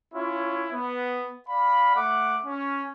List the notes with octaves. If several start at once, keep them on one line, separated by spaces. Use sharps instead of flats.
C#4 E4 F4 C#5
B3
D5 F5 B5
A3 F#5 D6
C#4